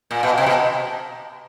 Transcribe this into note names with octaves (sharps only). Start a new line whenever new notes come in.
A#2
B2
C3
B2